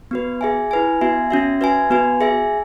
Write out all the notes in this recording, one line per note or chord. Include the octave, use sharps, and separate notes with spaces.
B3 F#4 B4
G#4 E5 G#5
E4 B4 G#5
B3 F#4 E5 G#5
C#4 F#4 E5
F#4 B4 E5 G#5
B3 F#4 B4 G#5
G#4 E5 G#5